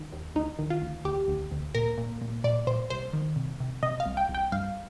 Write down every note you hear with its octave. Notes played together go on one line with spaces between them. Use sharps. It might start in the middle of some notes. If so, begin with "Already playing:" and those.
Already playing: D#3
D#2
D2 D#4
D#3
F4
D2
D2 G4
D2
D2
A#2 A#4
A#2
A#2
A#2 D5
A#2 C5
C2 C5
D#3
C2
C3
C3 D#5
F5
C2
G5
C2
G5
G2 F5